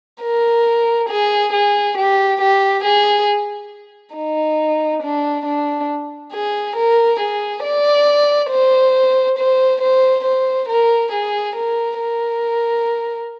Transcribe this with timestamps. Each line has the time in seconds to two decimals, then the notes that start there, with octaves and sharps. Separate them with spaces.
0.23 A#4
1.10 G#4
1.53 G#4
1.97 G4
2.41 G4
2.84 G#4
4.15 D#4
5.02 D4
5.46 D4
6.33 G#4
6.76 A#4
7.20 G#4
7.63 D5
8.50 C5
9.38 C5
9.81 C5
10.24 C5
10.69 A#4
11.12 G#4
11.56 A#4
11.99 A#4